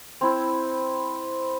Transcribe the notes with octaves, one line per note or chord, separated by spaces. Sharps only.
C4 E4